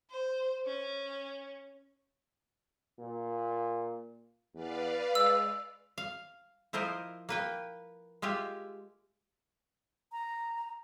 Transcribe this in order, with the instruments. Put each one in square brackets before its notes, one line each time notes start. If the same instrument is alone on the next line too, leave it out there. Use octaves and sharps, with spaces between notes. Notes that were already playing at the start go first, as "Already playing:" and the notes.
[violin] C5
C#4
[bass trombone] A#2
[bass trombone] E2 [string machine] B4 D5 F5
[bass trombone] G#3 [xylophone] E6
[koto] F5
F3 E4 A#4 C5 D#5
A#3 B4 G5
G#3 F4 G4 E5
[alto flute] A#5